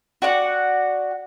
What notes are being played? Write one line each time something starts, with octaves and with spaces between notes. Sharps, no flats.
F#4 D5 F#5